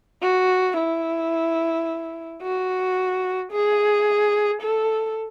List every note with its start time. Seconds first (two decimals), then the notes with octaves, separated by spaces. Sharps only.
0.22 F#4
0.77 E4
2.42 F#4
3.52 G#4
4.61 A4